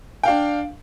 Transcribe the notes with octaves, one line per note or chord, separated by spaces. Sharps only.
D4 F5 G5